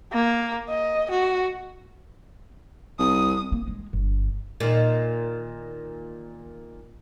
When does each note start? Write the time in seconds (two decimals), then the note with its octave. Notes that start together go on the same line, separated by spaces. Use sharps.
0.13 A#3
0.70 D#5
1.11 F#4
2.99 C2 D#6
3.52 A#3
3.68 G#3
3.93 G1
4.60 A#2 D#3